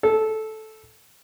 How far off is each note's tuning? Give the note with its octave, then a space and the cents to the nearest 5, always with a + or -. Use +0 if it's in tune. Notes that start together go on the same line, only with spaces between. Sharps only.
A4 -10